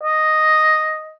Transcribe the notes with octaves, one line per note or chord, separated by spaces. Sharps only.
D#5